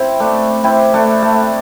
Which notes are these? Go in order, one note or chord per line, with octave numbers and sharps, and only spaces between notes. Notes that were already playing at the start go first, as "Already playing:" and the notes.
Already playing: C4 E4
A3 D4
C4 E4
A3 D4
A3